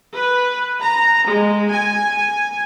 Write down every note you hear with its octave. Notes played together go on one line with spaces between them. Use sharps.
B4
A#5
G#3
G#5